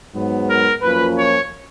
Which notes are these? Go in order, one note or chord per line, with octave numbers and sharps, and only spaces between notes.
G#2 F#3 B3
A#4
F#2 F3 A#3 C#4 F4 B4
C#5